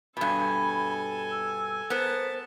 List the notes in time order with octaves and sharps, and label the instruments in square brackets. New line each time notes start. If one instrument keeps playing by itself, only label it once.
[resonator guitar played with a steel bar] G2 B2 [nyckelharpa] A4 G#5 [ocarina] B5
[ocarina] E6
[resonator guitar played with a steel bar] B3 A#4 [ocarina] C5 [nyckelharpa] A5